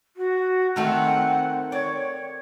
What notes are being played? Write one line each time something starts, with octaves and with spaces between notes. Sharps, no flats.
F#4
D#3 A3 C4 F#5
C#5 D5